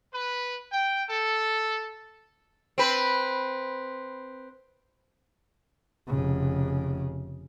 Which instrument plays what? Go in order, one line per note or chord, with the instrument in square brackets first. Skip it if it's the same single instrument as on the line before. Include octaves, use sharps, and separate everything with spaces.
[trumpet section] B4
G5
A4
[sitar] C4 B4
[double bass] F1 C#3